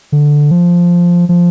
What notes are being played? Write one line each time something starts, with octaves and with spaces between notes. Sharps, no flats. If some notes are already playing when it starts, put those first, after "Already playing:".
D3
F3
F3